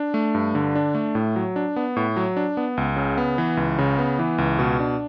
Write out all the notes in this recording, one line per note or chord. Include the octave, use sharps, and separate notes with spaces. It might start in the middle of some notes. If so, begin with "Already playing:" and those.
Already playing: D4
A3
G2
D3
D4
A3
A2
F#3
D4
B3
A2
F#3
D4
B3
C#2
C#3
B3
E3
C#2
C#3
B3
E3
C#2
B2
D4